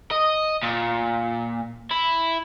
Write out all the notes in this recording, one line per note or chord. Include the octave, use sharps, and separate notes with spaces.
D#5
A#2
E4